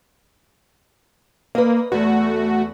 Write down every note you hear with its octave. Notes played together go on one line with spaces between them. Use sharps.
A#3 B4 D#5
E2 A3 F#4